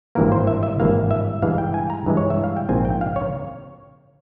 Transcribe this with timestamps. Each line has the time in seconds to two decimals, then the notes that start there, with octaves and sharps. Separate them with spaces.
0.15 G#1 G2 E3 A#3 A#4
0.32 C5
0.47 E5
0.63 E5
0.80 G#1 G2 E3 A#3 F5
1.11 E5
1.42 G2 E3 G#3 F5
1.58 G5
1.74 G#5
1.90 A#5
2.06 G2 E3 G#3
2.17 C#5
2.30 E5
2.44 F5
2.57 G5
2.69 A#1 G#2 F3 C4 G#5
2.85 G5
3.01 F5
3.16 C#5